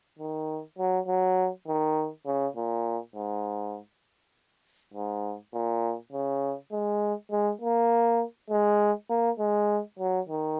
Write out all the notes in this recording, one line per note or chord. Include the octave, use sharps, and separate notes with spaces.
D#3
F#3
F#3
D#3
C#3
A#2
G#2
G#2
A#2
C#3
G#3
G#3
A#3
G#3
A#3
G#3
F#3
D#3